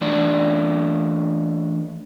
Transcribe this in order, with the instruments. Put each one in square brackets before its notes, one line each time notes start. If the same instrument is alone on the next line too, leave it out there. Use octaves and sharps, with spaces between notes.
[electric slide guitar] E3 A3 D4 D5